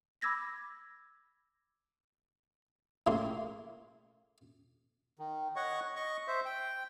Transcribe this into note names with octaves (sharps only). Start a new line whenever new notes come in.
B5 D6 E6 G#6 A#6 B6
A2 C#3 A#3 C6
D#3
C#5 D#5 F#5 C#6
D#5 C#6
C5 E5
G5